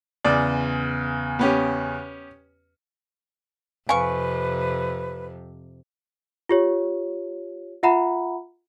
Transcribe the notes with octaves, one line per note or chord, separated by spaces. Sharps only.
E2 C#3 D5
B3 C#4 G4
F2 C3 B4 F5 G#5 C#6
F4 G4 C#5
F4 E5 F#5 A#5 B5